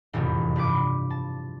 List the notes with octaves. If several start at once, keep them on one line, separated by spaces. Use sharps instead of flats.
E1 A1 F2 C3
G2 F3 B4 D6
A5